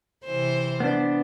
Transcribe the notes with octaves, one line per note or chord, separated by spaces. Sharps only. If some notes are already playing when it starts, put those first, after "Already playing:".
C3 E3 C5
B3 D4